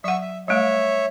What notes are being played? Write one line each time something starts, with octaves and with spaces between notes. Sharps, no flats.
F#3 E5 F#5 C#6 E6
E5
G3 A3 C#5 E5 F5